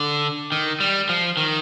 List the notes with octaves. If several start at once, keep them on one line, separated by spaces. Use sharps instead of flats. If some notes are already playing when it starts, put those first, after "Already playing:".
Already playing: D3
D#3
G3
F3
D#3